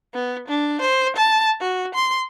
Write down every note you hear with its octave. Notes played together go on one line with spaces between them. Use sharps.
B3
D4
C5
A5
F#4
C6